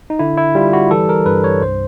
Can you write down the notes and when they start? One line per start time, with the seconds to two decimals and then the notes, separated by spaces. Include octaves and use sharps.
0.10 D#4
0.19 D3 E4
0.38 E4
0.55 G3 F4
0.73 F#4
0.91 E3 A4
1.09 A#4
1.26 G2 B4
1.44 C#5
1.62 C2 C5